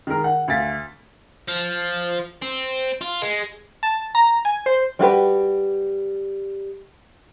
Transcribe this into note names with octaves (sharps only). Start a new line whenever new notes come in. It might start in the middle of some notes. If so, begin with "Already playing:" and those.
D#3 G#3 A#4
F#5
D2 F5 A6 B6
F3
C4
F4
G#3
A5
A#5
G#5
C5
G3 F#4 G4 B4